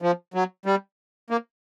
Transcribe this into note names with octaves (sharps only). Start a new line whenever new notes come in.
F3
F#3
G3
A#3